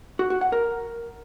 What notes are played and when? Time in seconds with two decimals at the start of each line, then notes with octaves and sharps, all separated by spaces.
0.19 F#4
0.30 F#4
0.41 F#5
0.52 A#4